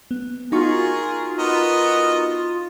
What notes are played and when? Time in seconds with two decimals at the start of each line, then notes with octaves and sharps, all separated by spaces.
0.11 B3
0.52 D#4 F4 F#4 G#4 A#4 C#6
1.38 B3 A#4 D#5